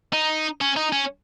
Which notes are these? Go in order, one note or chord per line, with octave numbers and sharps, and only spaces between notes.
D#4
C#4
D#4
C#4